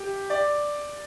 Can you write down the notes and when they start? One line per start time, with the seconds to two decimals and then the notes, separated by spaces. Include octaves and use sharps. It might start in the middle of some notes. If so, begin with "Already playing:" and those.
Already playing: G4
0.30 D5